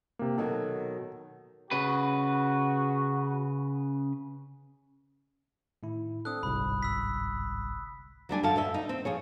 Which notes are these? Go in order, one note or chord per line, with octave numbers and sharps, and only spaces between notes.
C3 A#3
B2 D#3 F#3 A4
C#3 F#4 B4
A2 D#3 E4
C4 D4 A4 D#6 F#6
G1 C2 G#2 B5
E6 B6
F#3 G3 D4 G#5
F#2 D3 F#4 F5 A5
D2 D#5 E5
D#4
C4
F3 G#4 C#5